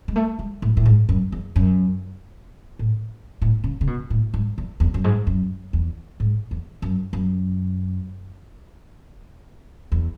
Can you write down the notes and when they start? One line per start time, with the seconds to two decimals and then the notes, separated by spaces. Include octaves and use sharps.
0.08 G#3
0.16 A3
0.39 G#3
0.62 A2
0.77 A2
0.86 G#2
1.09 F#2
1.32 E2
1.56 F#2
2.79 A2
3.42 A2
3.64 C#3
3.81 C#3
3.87 B2
4.10 A2
4.34 G#2
4.58 E2
4.80 E2
4.94 F#2
5.04 G#2
5.27 F#2
5.73 E2
6.20 G#2
6.51 E2
6.82 F#2
7.13 F#2
9.92 E2